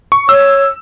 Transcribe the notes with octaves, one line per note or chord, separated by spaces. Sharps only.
C#6
C#5 E6